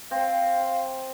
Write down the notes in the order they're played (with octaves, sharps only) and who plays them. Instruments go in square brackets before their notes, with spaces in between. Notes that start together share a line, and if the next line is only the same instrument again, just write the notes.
[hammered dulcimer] C4 [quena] F5